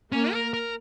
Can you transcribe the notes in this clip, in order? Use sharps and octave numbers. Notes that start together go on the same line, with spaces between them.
A#3 C#4
A#4
A#4